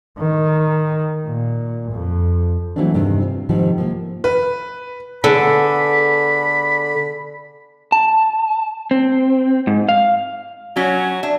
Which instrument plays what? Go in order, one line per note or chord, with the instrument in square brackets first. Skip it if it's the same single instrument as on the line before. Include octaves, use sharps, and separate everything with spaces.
[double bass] D#3
A#2
F2
[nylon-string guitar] E3 F#3 A3 A#3 C4 D4
E2 G2 C3 D#3 D4
C4 F4
G#2 C3 D#3 F3 G3
F3 A#3
[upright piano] B4
[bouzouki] D3 [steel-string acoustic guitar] B3 G#4 A4 [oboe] B5
[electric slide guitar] A5
C4
G#2
F5
[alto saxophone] F#3 [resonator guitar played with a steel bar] C#4
[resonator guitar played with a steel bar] D4 [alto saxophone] E5